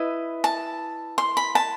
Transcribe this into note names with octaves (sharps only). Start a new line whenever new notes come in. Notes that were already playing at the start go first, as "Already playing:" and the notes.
Already playing: E4 B4 D#5
A5
C6
B5
A5